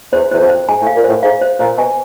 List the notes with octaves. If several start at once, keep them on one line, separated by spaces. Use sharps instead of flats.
E2 C5
E2 C5
F2
C5
G#2 G#5
A2
F5
A#2
A2 C5
G#2 F5
C5
A#2 C5
B2 G#5